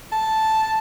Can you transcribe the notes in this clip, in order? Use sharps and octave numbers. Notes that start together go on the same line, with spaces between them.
A5